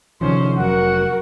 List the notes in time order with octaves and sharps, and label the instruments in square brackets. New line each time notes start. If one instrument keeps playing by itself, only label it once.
[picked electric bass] C3 D#3 F3 [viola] C#4 C5
[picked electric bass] F1 F#3 [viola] F#4 A#4 [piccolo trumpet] F#5